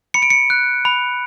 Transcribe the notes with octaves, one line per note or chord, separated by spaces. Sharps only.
B5 C#7
D7
C#7
F#6
B5